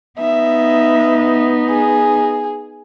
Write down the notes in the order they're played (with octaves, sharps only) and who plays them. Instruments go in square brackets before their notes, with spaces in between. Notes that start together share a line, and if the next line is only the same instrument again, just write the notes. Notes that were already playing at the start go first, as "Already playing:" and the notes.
[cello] B3 D#4 [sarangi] E5
[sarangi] G#4